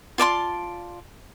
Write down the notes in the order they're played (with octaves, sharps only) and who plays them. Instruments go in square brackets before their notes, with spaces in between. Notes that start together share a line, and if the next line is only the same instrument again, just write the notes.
[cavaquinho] F4 D5 A5 C6